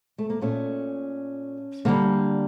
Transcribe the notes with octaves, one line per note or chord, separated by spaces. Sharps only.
A3
A#3
A#2 A3 C#4
D3 G3 A#3